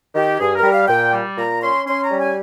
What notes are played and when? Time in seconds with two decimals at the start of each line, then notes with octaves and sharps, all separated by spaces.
0.15 D#3 G4
0.39 G2 G#4
0.56 A#4
0.63 G3
0.72 F5
0.88 A#2 G5
1.12 G3
1.37 A#2 A#5
1.62 C#4 C6
1.86 C#4 C6
2.03 A#5
2.11 G3
2.19 G#5